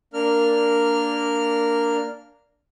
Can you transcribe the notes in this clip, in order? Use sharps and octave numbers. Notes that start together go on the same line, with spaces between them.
A#3 D4 A#4 F6